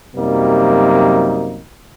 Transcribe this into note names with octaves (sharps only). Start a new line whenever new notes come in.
F#2 C3 F#3 G3 A#3 D#4